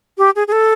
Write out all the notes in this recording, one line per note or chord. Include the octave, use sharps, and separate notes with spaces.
G4
G#4
G#4
A4